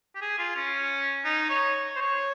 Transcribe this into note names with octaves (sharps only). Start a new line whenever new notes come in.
G4
G#4
F4
C#4
D#4
C#5
C5
C#5